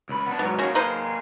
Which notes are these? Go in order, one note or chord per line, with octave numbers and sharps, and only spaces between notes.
C#2 B5
B3 D4
G#2 F#3 B3
A#3 C#4 F#4 G#4
D#4 B4 C5